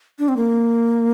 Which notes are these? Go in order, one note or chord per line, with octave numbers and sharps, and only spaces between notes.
D4
C4
A#3